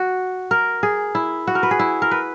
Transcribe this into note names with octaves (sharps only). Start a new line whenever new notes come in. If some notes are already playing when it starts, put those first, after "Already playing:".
Already playing: F#4
A#4
G#4
E4
F#4
A#4
B4
G#4
E4
A#4
B4